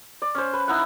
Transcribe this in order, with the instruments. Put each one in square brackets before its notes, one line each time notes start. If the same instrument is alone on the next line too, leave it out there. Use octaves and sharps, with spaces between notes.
[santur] D5
C#4 C5
B4
D#4 E4 F#5